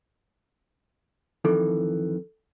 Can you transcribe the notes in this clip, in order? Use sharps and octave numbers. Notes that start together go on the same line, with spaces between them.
F2 D#3 E3 A4